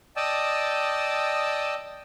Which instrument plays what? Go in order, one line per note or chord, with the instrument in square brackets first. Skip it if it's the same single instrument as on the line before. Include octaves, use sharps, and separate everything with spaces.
[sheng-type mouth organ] D5 D#5 G5 A5 D#6 E6